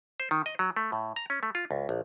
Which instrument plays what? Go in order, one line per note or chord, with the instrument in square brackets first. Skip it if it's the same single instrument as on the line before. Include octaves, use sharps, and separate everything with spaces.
[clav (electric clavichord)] C5
D#3
D#5
F#3
A3
A2
A#5
C#4
A3
F4
C#2
A#1